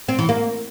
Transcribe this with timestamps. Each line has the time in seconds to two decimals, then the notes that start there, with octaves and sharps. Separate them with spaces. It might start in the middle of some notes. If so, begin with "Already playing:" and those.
0.08 C4
0.19 E3
0.29 A#3